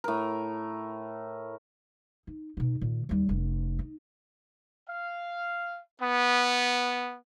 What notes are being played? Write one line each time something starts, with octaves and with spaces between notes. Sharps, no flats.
A2 A#4
D#4
B2 D#4
A#2 D#3
D#2 G3
F1 C#4
D#4
F5
B3